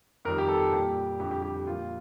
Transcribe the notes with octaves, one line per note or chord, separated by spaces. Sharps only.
F2 D#3 G3 A#4
G4
A4
A#2 G3 G4
F2 D3 G3 G4
G4
G4
G4
A#2 F3 F4